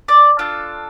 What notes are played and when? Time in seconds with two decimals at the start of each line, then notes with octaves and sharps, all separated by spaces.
0.08 D5
0.39 D4 F4 A4